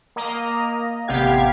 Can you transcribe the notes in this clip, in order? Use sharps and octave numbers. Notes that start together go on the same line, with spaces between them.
A#3 D#5 A#5
A1 C3 B3 G4 F5 G#6